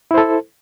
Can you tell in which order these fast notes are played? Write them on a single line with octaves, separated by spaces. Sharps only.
E4 C5 A4